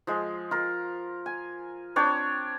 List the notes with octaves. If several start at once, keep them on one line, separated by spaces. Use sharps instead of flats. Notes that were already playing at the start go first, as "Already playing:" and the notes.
F3 G#3
F4 A#4
G#5
C4 D4 C#5 G5